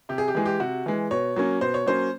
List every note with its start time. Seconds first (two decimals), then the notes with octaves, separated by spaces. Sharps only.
0.09 C3 G4
0.18 G#4
0.28 G4
0.35 E3 G#3 G#4
0.46 G4
0.60 C3 F#4
0.86 E3 G#3
1.11 B2 C#5
1.36 F#3 A#3 C#4
1.61 B2 C5
1.74 C#5
1.87 F#3 A#3 C#4 C5